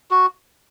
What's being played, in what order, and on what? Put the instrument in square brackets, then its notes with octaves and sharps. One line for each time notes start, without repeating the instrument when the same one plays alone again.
[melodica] F#4